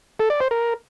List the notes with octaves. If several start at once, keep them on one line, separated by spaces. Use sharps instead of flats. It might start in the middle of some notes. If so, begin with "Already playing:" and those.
A4
D5
C5
A#4